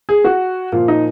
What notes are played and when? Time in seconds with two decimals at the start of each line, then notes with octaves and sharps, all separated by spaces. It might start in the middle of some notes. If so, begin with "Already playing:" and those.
0.09 G#4
0.24 F#4
0.72 A#2 F3 F4
0.88 D#4